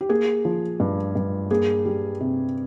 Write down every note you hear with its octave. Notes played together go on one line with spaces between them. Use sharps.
G4
A#3 G#4
F3
G2
G2
A#3 G#4
G3
C3